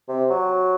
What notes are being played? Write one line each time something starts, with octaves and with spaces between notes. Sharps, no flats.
C3
F#3